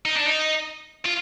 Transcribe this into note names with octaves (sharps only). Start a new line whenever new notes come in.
D#4
D4
D#4
F4